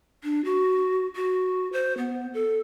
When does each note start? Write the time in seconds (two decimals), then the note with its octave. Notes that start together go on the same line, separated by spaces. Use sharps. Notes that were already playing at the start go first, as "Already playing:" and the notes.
0.24 D4
0.45 F#4
1.16 F#4
1.73 C5
1.98 B3
2.34 A4